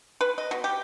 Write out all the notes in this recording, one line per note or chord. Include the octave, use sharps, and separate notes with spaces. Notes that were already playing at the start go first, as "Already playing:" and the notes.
B4
D#5
B2
G4